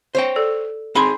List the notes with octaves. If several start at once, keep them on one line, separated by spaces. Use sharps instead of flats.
C5 C#5 G5
A4 D5
C4 D#4 G#4 B5 C6